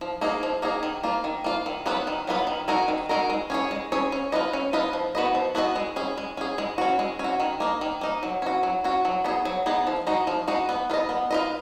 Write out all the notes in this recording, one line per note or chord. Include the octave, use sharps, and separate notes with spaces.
F3
A#3 D#4 G#4
F3
A#3 D#4 G#4
D#3
A#3 F4
D#3
A#3 F4
D#3
F#3 B3 F4 B4
D#3
F#3 B3 F4 B4
D#3
G#3 D#4 F#4 A#4
D#3
G#3 D#4 F#4 A#4
G#3
C#4 G#4 C#5
G#3
C#4 G#4 C#5
C#4
F4 B4 D#5
C#4
F4 B4 D#5
F3
B3 F#4 B4 D#5
F3
B3 F#4 B4 D#5
G#3
C#4 G#4
G#3
C#4 G#4
G#3
C#4 F#4
G#3
C#4 F#4
D#3
A#3 D#4
D#3
A#3 D#4
F#3
C#4 F#4
F#3
C#4 F#4
F#3
B3 D#4 G#4
F#3
B3 D#4 G#4
F3
G#3 D#4 F#4
F3
G#3 D#4 F#4
B3
F4 B4 D#5
B3
F4 B4 D#5